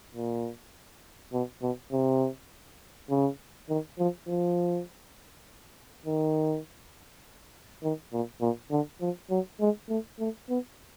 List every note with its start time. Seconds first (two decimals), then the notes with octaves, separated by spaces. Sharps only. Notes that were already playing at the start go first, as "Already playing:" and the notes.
0.14 A#2
1.33 B2
1.62 B2
1.92 C3
3.10 C#3
3.69 D#3
3.99 F3
4.28 F3
6.05 D#3
7.83 D#3
8.13 A#2
8.41 A#2
8.71 D3
9.01 F3
9.30 F#3
9.61 G#3
9.89 A3
10.19 A3
10.49 B3